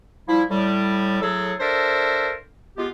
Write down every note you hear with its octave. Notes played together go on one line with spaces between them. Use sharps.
F3 G3 E4
A2 G3
A2 F#3 G#4 A4
D4 A4 A#4 C5 E5
G#3 B3 F4 G4